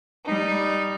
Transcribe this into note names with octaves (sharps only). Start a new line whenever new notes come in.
G3 D#4